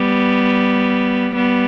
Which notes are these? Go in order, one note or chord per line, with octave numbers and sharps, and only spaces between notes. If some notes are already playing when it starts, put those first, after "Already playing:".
Already playing: G3 B3
G3 B3